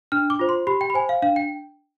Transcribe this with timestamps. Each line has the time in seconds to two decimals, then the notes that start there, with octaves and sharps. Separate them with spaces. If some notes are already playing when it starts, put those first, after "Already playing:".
0.12 D4 F6
0.30 D6
0.39 F4 C5
0.49 C6
0.67 G4 B5
0.81 G5
0.90 B5
0.94 C5 G#5
1.09 F5
1.22 D4 F5
1.36 G5